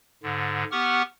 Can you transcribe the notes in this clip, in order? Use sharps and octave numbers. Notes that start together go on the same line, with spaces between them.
G#2 D3
B3 G4 F#5 C#6 F6